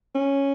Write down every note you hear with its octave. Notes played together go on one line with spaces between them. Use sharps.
C#4